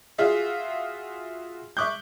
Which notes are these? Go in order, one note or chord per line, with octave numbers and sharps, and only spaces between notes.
F4 F#4 G#4 E5 F5
E5 C#6 D6 F#6 G6